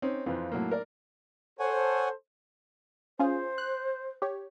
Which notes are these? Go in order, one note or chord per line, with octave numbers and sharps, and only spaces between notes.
C4 C#4 D#4
F2 E3 C4 F4
A2 F#3 A3 A#3
A#4 D5
A4 C5 C#5 F#5 G#5
C#4 F4 G#4 C5
F#6
G4 C#5